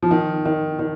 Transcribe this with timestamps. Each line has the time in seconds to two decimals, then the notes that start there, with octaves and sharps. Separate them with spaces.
0.03 F3
0.11 D#3
0.46 D#3
0.79 D#3